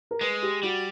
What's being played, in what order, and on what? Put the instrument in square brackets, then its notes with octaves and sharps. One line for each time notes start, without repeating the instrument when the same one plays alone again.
[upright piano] A#4
[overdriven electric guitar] G#3 [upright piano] B4
[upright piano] G4
[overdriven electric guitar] G3 [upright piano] F#4